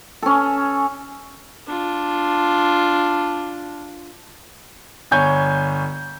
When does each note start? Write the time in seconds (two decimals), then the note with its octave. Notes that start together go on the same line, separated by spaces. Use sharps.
0.22 C#4 A4
1.67 D4 F4
5.11 G1 C#5 G#5 G6